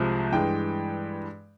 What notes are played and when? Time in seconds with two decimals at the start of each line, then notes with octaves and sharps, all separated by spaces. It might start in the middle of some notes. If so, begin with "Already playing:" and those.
Already playing: C2 C3 F3 G#3
0.32 G2 E3 G#3 G5